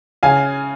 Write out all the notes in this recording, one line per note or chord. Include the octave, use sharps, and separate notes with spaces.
C#3 F5 G#5